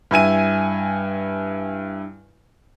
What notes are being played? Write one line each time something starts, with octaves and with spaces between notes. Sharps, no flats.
G2 E4 G#5 D#7